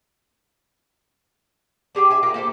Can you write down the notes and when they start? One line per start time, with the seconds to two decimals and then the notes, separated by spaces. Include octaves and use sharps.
1.95 D4 G4 G#4 G5
2.10 E5 G#5
2.23 F4 G4 A#4
2.34 A#3 G4 A4 C5